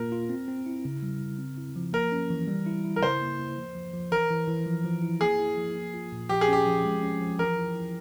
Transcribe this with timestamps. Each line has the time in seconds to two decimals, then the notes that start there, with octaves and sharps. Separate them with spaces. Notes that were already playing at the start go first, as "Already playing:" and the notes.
Already playing: A#2 A#3 F4 A#4
0.12 F4
0.29 C4
0.48 C4
0.66 E4
0.85 C#3
1.02 G3
1.21 C#3
1.38 C4
1.58 E4
1.76 F3
1.93 A#3 A#4
2.12 C#4
2.30 E3
2.48 G3
2.66 E4
2.84 E4
2.96 A#4
3.03 C#3 C5
3.21 A#3
3.39 A#3
3.57 F3
3.75 F3
3.93 F3
4.12 E3 A#4
4.30 E3
4.48 E3
4.66 F3
4.85 F3
5.02 E4
5.20 A#3 G#4
5.39 E4
5.57 F3
5.75 A#3
5.94 F4
6.12 A#2
6.29 F3 G4
6.41 G#4
6.48 C#4 G4
6.67 F3
6.85 G#3
7.03 C#4
7.20 F3
7.39 E3 A#4
7.57 E4
7.75 E4